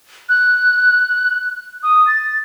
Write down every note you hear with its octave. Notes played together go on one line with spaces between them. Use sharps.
F#6
D#6
A6